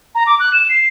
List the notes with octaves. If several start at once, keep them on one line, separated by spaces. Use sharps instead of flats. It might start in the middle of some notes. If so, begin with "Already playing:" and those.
A#5
D6
F#6
E7
C7